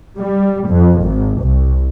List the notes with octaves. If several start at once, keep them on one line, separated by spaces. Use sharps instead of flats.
G3
F2
G#1
C2